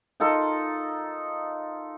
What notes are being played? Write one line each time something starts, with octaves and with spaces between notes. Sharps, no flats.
D#4 F4 A4 A#4